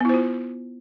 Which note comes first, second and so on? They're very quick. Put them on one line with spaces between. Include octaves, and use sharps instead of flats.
B3 E4 C5 F4